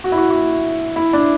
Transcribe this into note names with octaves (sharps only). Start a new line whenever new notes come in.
F#4
E4
F#4
F#4
E4
D4